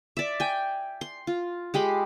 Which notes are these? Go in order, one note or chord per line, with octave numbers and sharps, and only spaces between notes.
D5 E5
G5 G#5
C6
F4
G#3 G4 B5 C6